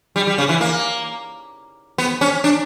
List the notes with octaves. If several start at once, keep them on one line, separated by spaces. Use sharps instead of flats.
G3
G3
C#3
E3
A#3
B3
C#4
D4